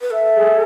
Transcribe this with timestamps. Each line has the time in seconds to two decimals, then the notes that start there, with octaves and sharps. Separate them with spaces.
0.01 B4
0.11 A4 E5
0.34 G#4